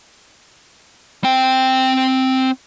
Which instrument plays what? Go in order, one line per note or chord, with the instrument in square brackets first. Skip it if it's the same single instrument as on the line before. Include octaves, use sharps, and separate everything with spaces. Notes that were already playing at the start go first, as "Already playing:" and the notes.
[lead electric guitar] C4 G5